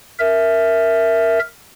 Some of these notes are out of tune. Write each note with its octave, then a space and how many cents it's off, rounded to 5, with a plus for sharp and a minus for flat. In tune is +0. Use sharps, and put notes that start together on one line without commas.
A#4 +0 E5 +0